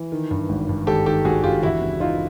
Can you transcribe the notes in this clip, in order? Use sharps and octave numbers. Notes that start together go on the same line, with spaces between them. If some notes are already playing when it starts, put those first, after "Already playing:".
Already playing: E3
D#3
G2
G#1
G2
G#1 G4 A4
D#3 G4 A4
G#1 F#4 G#4
G2 F4 G4
E2 E4 F#4
C#3
E3 D#4 F4